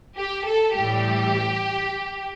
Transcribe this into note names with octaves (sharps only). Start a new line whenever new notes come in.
G4
A4
A2 E3 G3 G4